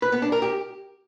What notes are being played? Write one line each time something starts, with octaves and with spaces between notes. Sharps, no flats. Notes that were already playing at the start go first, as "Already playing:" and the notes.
B4
B3
D4
A#4
G4